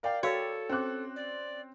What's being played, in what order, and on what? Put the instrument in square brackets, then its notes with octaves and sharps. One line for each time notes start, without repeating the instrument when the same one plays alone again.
[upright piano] A#4 D5 G5 [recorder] F5
[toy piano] F#4 F5 E6 [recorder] A4 [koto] C#5
[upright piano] C4 F#6 [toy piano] C#4 D6
[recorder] D5